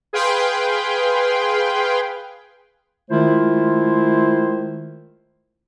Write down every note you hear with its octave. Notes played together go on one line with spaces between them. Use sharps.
G#4 B4 F5 G5 C6
D#3 G#3 A3 E4 F4 C5